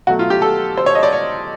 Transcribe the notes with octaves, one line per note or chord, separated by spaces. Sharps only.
B2 F#3 A3 F#4
F4
G4
A4
C5
C#5
D#5
D5
C#5